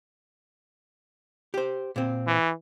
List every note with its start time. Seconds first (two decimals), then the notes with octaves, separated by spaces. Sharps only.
1.54 G4 C5
1.96 A#2 C4
2.27 E3